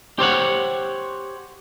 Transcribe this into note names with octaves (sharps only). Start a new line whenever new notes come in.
G4 C5 C#5 F#5